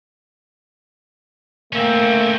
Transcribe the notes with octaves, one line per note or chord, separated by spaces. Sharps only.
A3 A#3 C4 C#4